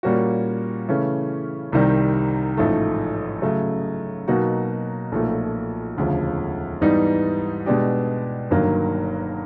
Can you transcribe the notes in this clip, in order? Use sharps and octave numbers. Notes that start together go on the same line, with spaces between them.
A#2 G3 A#3 C#4 F#4
C#3 E3 A3 C#4
C2 C3 D#3 G3
A1 G#2 F3 A3
C#3 F#3 A3
B2 F#3 A#3 D#4 F#4
B1 A#2 F3 A3
E1 D2 C#3 F3
G#2 E3 G3 B3 D#4
B2 G#3 B3 D4 G4
G1 G2 D#3 F#3 A#3